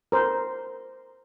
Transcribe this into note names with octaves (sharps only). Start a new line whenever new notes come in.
A#4 C5